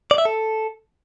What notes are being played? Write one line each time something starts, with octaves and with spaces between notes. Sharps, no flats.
D5
E5
A4